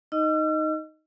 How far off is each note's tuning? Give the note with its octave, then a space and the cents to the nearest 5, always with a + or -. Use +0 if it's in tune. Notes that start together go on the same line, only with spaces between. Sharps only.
D#4 +0 D#5 +0 E6 +45